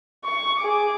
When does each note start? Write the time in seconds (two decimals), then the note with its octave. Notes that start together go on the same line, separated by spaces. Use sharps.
0.25 C#6
0.59 G#4 D6